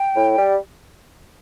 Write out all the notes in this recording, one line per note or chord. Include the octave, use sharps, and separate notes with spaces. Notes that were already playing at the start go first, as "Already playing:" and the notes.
Already playing: G5
A2
G3